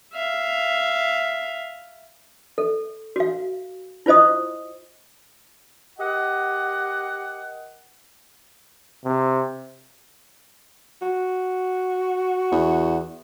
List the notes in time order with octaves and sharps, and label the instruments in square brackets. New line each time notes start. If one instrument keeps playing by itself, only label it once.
[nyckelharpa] E5 F5
[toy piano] A4
F#4 F5
E4 F4 C5 D#5 D#6
[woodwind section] G4 A#4 D#5 F#5
[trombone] C3
[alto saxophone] F#4
[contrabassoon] E2